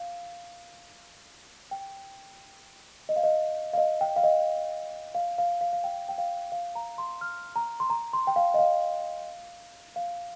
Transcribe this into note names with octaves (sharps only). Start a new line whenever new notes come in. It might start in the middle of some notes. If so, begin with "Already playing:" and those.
Already playing: F5
G5
D#5
F5
D#5
F5
D#5
G5
F5
D#5
F5
F5
F5
F5
G5
G5
F5
F5
A#5
C6
F6
A#5
C6
A#5
C6
G5
F5
D#5
F5
F5